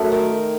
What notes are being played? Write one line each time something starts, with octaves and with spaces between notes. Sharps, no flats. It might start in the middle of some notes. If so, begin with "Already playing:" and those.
Already playing: F#2 A3
D#3